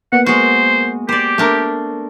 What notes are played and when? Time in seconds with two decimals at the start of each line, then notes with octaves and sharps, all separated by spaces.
0.13 A#3 B3 F#5
0.26 G#3 F#4 C5
1.09 G4 C5 D5
1.38 A3 D4 A#4